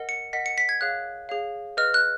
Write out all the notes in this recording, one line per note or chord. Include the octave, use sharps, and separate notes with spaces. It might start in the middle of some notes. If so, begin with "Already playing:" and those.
Already playing: A#4 D#5 F#5
C#7
A#4 D#5 F#5 B6
C#7
B6
G#6
G#4 C#5 F5 F#6
G#4 C#5 F5
G#4 B4 D#5 F6
F#6